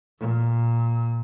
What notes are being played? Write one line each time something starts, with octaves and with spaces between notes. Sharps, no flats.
A#2